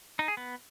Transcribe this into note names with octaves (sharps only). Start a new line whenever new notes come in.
D#4
G#4
B3